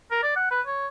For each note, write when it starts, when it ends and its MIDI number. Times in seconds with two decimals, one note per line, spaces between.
0.11 0.19 70
0.23 0.32 74
0.36 0.47 78
0.51 0.61 71
0.66 0.87 73